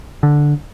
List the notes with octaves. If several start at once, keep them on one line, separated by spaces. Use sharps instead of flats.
D3